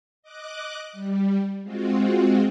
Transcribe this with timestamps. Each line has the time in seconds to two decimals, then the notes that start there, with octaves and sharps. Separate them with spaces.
0.22 D#5 D6 F#6
0.93 G3
1.63 G#3 C4 F4 F#4